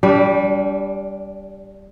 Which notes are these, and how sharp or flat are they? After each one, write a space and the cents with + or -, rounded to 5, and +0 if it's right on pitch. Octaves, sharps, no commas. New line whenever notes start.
G3 +0 D4 -35